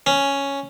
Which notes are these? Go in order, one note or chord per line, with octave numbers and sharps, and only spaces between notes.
C#4